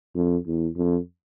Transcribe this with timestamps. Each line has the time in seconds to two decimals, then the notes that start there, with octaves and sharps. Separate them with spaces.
0.15 F2
0.47 E2
0.76 F2